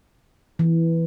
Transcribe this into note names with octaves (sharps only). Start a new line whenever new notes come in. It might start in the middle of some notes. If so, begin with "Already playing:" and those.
E3